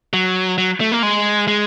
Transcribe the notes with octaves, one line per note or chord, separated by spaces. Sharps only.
F#3
F#3
A3
A#3
G#3
G#3